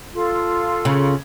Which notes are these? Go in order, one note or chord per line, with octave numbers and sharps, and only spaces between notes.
F4 A4
C#3